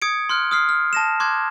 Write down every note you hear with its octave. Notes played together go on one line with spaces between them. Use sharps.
D#6 G#6 C#7 D7
C6 F6 F#6
D#6 F6 C7
F6
A5 A#6 E7
C6 D6 F#6 G#6